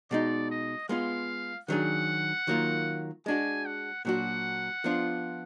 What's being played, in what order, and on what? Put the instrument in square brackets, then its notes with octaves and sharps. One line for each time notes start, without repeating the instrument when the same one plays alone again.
[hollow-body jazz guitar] B2 G#3 D#4 [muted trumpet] D5
[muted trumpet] D#5
[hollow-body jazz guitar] G#3 B3 F4 [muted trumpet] F5
[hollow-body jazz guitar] D#3 F#3 D4 G#4 [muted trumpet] F#5
[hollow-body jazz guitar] D#3 F#3 A#3 F4
[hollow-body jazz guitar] G#3 D4 F#4 [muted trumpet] G#5
[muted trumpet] F#5
[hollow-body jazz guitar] A#2 F#3 D4 F#4 [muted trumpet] F#5
[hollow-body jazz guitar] F3 B3 D4 F4